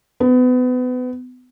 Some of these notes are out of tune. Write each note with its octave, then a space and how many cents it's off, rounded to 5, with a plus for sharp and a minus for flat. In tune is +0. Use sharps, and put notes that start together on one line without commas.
B3 +30